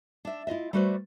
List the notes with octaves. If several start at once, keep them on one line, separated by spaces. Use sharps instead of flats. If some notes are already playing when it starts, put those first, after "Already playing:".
D4 E5
E4 F4 D#5 E5
G3 A3 F#4 B4 C5 D5